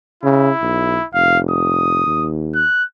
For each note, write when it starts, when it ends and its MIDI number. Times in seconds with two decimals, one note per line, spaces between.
0.23 0.51 49
0.23 1.07 64
0.61 0.98 35
1.14 2.02 29
1.14 1.39 77
1.51 2.28 87
2.06 2.64 39
2.55 2.84 90